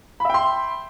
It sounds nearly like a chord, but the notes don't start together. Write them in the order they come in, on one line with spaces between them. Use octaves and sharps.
B5 E5 G5 C6